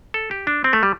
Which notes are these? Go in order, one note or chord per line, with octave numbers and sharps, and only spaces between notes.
A4
G4
D4
C4
A3
G3